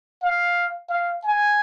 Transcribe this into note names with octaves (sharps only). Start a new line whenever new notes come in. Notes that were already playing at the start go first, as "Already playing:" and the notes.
F5
F5
G#5